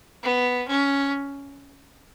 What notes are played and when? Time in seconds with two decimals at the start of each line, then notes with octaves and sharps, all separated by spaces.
0.23 B3
0.68 C#4